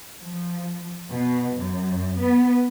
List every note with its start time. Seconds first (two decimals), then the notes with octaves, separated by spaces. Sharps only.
0.23 F3
1.11 B2
1.56 F#2
2.19 B3